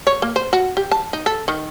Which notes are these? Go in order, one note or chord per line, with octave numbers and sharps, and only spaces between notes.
C#5
A#3
C5
F#4
G4
A5
D#4
A4
D#3